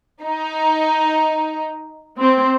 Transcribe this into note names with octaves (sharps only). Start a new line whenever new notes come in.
D#4
C4